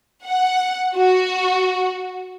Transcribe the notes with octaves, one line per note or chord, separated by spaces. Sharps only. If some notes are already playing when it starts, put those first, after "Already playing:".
F#5
F#4